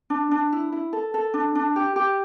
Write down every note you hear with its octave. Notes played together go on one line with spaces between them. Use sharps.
D4
D4
E4
E4
A4
A4
D4
D4
G4
G4